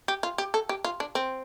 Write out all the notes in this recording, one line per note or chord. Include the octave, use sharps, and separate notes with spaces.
G4
F4
G4
A4
G4
F4
D4
C4